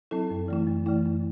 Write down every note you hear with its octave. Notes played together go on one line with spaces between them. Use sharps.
F#3 C4 E4 A4
F#2
E3 A3 E4
F#2
E3 A3 E4
F#2